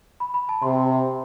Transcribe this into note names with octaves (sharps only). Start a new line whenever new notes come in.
B5
B5
A5
C3 C6